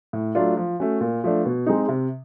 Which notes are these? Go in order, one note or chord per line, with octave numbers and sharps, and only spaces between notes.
A2
F#3 A3 D4 F4
F3
A3 C#4 F#4
A#2
F3 A3 D4
B2
G#3 C4 D#4
C3